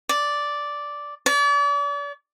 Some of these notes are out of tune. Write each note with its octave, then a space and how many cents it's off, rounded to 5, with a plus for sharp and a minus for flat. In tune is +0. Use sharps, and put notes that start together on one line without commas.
D5 -5
D5 -40